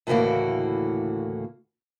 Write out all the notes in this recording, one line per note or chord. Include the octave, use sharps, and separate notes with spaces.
D2 A2 C#3 E3 A#3 F#4